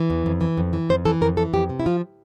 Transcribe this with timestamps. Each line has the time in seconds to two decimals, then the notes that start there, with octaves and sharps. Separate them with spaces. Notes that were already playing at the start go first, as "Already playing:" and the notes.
Already playing: E3
0.10 E2
0.26 F2
0.41 E3
0.57 F2
0.73 E3
0.89 F2 C5
1.05 E3 A4
1.21 F2 A#4
1.37 E3 A4
1.53 F2 G4
1.70 C3
1.80 E4
1.86 F3 F4